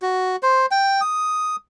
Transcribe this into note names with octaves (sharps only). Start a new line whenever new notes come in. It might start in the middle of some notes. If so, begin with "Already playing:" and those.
F#4
C5
G5
D#6